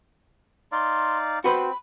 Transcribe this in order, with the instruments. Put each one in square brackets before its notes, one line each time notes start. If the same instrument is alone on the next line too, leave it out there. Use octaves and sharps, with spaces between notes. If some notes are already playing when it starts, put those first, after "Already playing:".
[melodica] D#4 D5 F5 [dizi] C6
[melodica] C4 [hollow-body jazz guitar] F#4 B4 C5 [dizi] B5